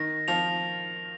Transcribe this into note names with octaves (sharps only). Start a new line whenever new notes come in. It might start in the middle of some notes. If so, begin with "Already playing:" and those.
Already playing: D#3 A#6
F3 F7